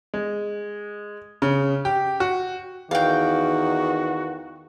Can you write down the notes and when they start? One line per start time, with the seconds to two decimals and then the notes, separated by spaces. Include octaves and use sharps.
0.14 G#3
1.42 C#3
1.85 G4
2.20 F#4
2.91 E2 D#3 F#4 F5 G5